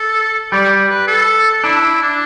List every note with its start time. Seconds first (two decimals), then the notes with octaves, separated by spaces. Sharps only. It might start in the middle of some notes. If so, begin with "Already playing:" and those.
Already playing: A4
0.52 G3 D5
0.89 B4
1.08 A4
1.64 D4 E4
2.02 D4